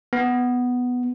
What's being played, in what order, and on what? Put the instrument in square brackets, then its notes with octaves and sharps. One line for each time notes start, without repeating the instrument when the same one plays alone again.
[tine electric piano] B3